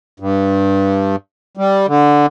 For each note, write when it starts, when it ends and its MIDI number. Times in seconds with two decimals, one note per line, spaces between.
0.20 1.16 43
1.57 1.86 55
1.88 2.26 50